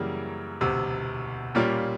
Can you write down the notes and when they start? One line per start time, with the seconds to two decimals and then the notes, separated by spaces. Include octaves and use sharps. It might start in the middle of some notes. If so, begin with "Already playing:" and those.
Already playing: F#2 C#3 E3 G3 A#3
0.61 E1 D2 C3
1.55 A#2 G3 A#3 C#4 F4